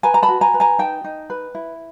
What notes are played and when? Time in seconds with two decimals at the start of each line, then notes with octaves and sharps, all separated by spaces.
0.03 B4 G#5 A#5
0.14 A#5
0.22 A5 B5
0.28 F#4
0.41 G#5 A#5
0.54 B4
0.60 G#5 A#5
0.79 D#4 G5 A5
1.04 D#4
1.30 B4
1.55 E4